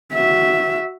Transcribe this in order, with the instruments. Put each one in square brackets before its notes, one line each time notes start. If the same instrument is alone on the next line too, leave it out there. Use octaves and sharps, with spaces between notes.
[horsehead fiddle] F#4 E5